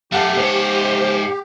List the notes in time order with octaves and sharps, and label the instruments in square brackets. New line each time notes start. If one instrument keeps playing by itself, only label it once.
[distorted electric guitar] F#2 A3 [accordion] G4 [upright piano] F5 F#5 A5
[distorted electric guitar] G#2 C#5 [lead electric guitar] C5